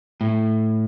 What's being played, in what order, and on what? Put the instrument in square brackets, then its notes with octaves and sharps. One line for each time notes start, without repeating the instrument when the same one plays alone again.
[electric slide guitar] A2